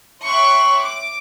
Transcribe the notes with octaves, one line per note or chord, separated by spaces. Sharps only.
C#5 E5 G5 C6 C#6 F#6
D6